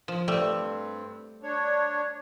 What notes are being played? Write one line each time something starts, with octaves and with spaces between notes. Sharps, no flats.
F3
G2 G3 A3 C4
D4 C#5